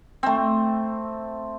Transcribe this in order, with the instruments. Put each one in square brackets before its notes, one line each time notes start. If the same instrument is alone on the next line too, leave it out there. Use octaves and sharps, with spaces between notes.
[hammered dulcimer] A3 C4